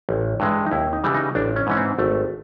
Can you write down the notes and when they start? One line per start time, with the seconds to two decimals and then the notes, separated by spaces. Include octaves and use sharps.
0.09 A1
0.40 G2 E3 G#3
0.66 D#4
0.71 D#2 E4
0.93 D#4
1.04 C#3 E3 G3
1.14 D#4
1.35 A1 D4
1.56 C#4
1.67 G#2 E3 C#4
1.77 C4
1.99 G#1 A3